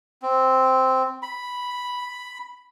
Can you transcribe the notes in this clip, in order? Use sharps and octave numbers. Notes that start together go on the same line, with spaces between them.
C4
B5